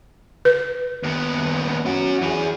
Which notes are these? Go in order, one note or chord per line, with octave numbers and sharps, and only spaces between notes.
B4
D#2 B3
C#4 F#4
E3 G#4